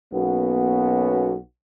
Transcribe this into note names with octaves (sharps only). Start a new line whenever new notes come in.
B1 A#3 B3 C#4 F#4